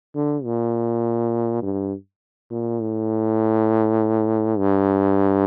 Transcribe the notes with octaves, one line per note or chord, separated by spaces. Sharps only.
D3
A#2
G2
A#2
A2
G2